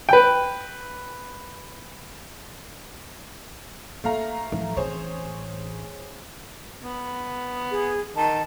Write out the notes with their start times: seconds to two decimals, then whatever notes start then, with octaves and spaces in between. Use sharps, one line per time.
0.09 B4 G5
4.04 A3 A#3 F5 A#5
4.52 A1 F3
4.77 E3 C4 G#4 C5 C#5
6.84 B3
7.71 G#4
8.16 D#3 A5